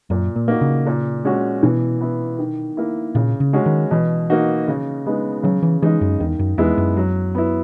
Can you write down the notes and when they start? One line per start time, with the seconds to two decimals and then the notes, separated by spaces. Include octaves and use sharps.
0.10 F#2 A#2
0.36 A#2
0.48 A#3 D#4 F#4
0.61 C#3
0.87 A#2
1.25 G#3 C#4 F#4
1.63 B2 E3
2.01 B3 E4
2.39 D#3
2.77 A#3 E4
3.15 A#2 C#3
3.40 C#3
3.53 G#3 C#4 F#4
3.66 D#3
3.91 B2 E3
4.30 A#3 D#4 F#4
4.68 C#3
5.06 G#3 B3 D#4
5.43 C#3 F#3
5.62 E3
5.82 E3 G#3 D#4
6.01 F#2
6.20 E2 D#3
6.39 F#2
6.58 E2 G#3 B3 E4
6.78 F#2
6.97 F#3
7.35 B3 E4